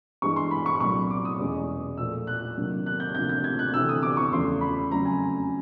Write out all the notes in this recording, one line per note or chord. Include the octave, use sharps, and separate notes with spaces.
G2 E3 G#3 C#6
C6
B5
C#6
C2 A#2 F#3 C#6
D6
D#6
E2 B2 G#3 C#4
A#2 F3 A3 E6
F#6
C3 D#3 F#3 A#3 D4
F#6
G6
D2 C3 F3 A#3 G6
G6
G#6
F#6
D2 C3 E3 A3 C4 E6
D#6
D6
C#6
E2 C#3 F3 A3 C6
B5
F2 C#3 F#3 A3 A#5
G#5